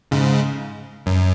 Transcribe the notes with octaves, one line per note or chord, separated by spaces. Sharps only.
G#2 C#3
F#2